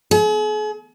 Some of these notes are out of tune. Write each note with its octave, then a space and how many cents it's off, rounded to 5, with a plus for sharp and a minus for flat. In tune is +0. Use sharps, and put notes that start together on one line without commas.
G#4 +40